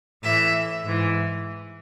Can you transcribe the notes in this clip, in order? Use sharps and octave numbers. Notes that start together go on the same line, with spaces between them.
A2 E3 E5
G#2 E3